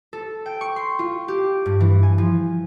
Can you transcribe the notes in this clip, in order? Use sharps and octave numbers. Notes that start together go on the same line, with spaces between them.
A4
G5
C#6
C6
F4
G4
G2
E3
G#5
F3